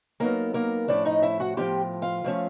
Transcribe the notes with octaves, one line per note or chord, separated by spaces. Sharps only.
F#3 A#3 B3 D#4 A#4
A#3 A#4
A2 F3 A3 C#4 D4 E4 D5
D#4 D#5
E4 E5
F#4 F#5
A2 F3 G#3 C#4 F4 G4 G5
F4 F5
A2 F3 A3 C#4